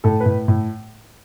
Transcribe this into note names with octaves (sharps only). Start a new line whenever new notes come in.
A2 A4
B4
A2
A2